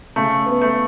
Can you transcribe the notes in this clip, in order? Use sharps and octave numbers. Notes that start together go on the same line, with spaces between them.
C#3 A3
B3
A3